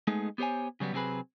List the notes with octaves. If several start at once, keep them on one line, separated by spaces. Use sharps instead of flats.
G#3 A3 B3 D#4 G#4
B3 G4 C5 C#5 G#5
C#3 F#3 G3 B3
C3 F#3 C4 G#4 B4